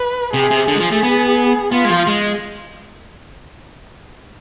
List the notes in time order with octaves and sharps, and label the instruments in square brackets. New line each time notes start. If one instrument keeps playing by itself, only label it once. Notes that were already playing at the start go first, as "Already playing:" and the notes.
Already playing: [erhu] B4
[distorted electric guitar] C3 [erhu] G#4
[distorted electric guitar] C3
[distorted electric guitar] D3 [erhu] G#4
[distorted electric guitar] G#3
F3
A3
B3
[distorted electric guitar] B3 [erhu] F4
[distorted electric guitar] G#3
F3
G#3